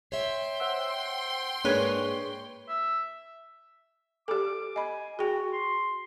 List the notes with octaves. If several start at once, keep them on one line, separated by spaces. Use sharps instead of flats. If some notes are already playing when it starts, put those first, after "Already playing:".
C#5 E5 G5 C6
C5 F#5 E6
G#2 A#3 D4 G#4 B4 C#5 D#5
E5
G4 A4 D6
D#5 G#5 B5
F#4 G#4 G5
C6